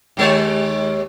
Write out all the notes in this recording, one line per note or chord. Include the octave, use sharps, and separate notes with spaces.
D#2 G#3 C#5